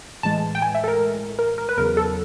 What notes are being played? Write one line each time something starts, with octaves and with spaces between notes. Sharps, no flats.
A2 E3 G#3 A5
G5
G#5
E5
A4
A#4
A#4
A#4
B4
E2 C#3 F#3 A#4
A4